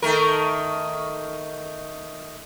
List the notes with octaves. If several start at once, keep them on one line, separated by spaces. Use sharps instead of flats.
D#3 A3 A#4